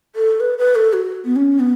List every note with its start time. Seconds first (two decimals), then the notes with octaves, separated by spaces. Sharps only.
0.16 A4
0.40 B4
0.58 B4
0.75 A4
0.93 F#4
1.25 B3
1.36 C#4
1.60 B3